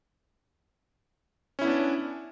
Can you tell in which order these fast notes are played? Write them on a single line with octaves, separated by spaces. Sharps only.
C#4 E4 B3 D4